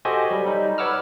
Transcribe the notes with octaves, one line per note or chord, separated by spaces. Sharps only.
F#4 G4 A4 C5 D#5 G#5
F#3 G3
G3 D#4
B4 C#5 F#5 D6 E6 F6